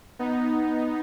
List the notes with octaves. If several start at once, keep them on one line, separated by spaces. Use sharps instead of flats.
B3 D#4